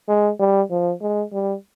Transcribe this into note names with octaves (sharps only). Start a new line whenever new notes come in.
G#3
G3
F3
G#3
G3